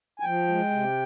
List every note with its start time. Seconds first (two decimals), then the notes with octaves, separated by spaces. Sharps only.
0.20 G#5
0.23 F3 G5
0.48 G#3
0.70 C3